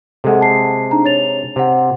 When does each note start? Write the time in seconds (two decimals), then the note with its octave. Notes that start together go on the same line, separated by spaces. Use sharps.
0.24 C3 G#3 A4 F#5
0.41 A5 C7
0.91 D4 D#4 A#5
1.05 C#5 A6 F7
1.56 C3 C5 F#5